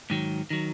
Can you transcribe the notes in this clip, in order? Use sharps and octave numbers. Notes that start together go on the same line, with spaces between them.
G#2 D#3 F#3
D#3 F#3